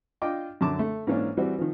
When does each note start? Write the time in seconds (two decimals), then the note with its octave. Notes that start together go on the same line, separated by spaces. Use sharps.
0.22 D4 F4 D#5 G5 D6
0.61 F#2 D3 A5 D6
0.79 A3
1.07 G#2 E3 A#3 C#4 D4
1.37 E3 G3 C4 F#4 D5
1.59 D#3 F3